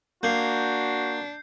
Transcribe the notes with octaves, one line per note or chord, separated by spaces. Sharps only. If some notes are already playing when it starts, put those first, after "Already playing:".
A#3 D4 F#4 G6 C7